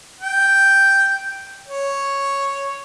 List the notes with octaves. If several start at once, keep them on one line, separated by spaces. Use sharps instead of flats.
G5
C#5